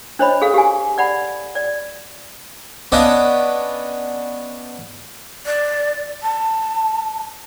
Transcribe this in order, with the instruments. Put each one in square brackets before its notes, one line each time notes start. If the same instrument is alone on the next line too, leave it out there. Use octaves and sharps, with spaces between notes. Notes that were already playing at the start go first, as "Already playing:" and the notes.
[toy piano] D4 C5 C#5 D#5 B5
G#4 A4 F5
G4 F5 G#5
D5 F#5 B5
D5
[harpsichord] B3 C#4 D4 D5 D#5 F5
[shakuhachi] D5
A5